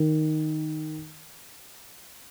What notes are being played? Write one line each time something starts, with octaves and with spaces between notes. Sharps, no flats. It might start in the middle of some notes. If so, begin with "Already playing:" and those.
Already playing: D#3